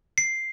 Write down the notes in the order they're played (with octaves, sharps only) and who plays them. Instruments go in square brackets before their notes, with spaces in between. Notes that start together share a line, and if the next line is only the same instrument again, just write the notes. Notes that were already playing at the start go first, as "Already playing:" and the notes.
[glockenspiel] C7